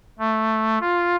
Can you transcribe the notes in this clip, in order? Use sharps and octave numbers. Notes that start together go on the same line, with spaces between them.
A3
F4